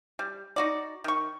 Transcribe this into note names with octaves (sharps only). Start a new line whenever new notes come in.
G3
D#4 F#4 D5
D#3 C#6